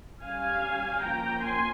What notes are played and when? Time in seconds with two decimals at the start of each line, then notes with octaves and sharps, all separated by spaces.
0.22 G3 C#4 F5 G#5
1.02 F3 A#3 C#4 G5 A#5
1.42 G#5 C6